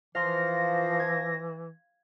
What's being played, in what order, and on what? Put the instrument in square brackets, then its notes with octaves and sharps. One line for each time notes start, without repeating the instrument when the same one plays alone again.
[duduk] E3 [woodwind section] F3 [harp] F5 C6 [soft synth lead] A#6
[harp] G#6